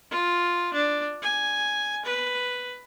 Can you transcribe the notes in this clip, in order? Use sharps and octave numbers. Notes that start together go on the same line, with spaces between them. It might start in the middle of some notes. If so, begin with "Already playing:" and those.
F4
D4
G#5
B4